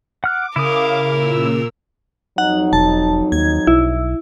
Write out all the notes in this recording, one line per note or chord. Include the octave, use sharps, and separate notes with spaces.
F#5 D6 F6 F#6
C#3 E4 A#4 F5 D6 D#6
A#2 E6
F2 F#3 D#4 F#5
E1 A5
D#2 G#6
B1 E4